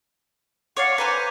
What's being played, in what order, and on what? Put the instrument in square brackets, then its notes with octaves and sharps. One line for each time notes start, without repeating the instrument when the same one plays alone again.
[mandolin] C#5 D5 F5 [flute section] F#5
[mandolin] B4 C5 G#5 [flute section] A#5 D6
[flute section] F#6